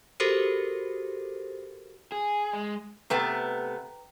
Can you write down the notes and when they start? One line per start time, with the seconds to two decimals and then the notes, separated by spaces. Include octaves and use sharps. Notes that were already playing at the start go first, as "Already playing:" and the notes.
0.20 F#4 G4 A4 A#4 C5
2.12 G#4
2.53 G#3
3.10 C3 A3 B3 B4 G5 A#5